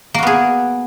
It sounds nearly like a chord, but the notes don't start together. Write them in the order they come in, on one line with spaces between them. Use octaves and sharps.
A#3 F#4 B3 G#4